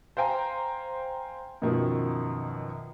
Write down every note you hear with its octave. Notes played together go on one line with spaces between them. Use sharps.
C5 F5 G5 G#5 A#5
F#2 B2 D#3 F3